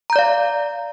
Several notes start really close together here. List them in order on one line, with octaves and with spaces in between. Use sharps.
A#5 G6 D5 F5